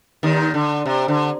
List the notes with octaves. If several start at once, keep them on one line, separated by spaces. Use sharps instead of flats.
D#2 D#3
D3
C3
D3